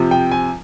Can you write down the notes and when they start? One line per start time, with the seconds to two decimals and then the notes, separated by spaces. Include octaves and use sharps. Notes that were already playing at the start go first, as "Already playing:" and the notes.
Already playing: C3 F3
0.11 G5
0.32 G#5